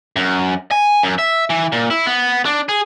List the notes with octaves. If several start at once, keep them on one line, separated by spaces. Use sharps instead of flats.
F#2
G#5
F#2
E5
E3
A#2
E4
B3
D4
G#4